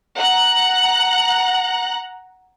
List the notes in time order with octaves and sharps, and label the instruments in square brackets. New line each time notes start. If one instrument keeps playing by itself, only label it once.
[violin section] F#5 A#5 F#6